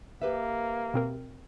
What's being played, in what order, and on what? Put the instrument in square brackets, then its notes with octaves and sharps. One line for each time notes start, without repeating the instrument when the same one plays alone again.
[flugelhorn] A#3 [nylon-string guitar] G4 B4 E5
[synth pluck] B2 C4 A#4